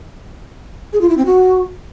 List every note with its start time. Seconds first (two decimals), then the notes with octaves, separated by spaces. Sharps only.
0.93 G#4
1.01 F4
1.09 E4
1.18 C4
1.26 F#4